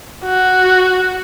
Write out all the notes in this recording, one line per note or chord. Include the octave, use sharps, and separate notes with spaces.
F#4